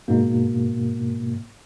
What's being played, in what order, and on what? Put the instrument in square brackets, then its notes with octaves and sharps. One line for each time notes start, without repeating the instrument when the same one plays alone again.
[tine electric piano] G#2 B2 A#3